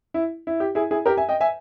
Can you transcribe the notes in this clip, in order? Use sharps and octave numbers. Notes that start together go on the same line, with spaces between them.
E4
E4
G4
E4 G#4
E4 G#4
G4 A#4
E5 G#5
D#5 G5
E5 G#5